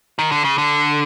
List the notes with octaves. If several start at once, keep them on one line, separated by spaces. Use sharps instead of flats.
D#3
D3
C#3
D3